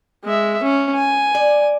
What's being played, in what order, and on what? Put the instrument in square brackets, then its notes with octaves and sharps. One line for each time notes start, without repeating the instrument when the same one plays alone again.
[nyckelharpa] G#3 E5
C#4
G#5
[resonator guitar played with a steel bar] D5